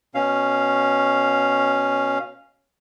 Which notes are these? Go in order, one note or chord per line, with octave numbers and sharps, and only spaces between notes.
B2 C#4 F5